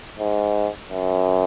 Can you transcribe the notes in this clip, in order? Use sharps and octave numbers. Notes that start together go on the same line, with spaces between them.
G#2
F#2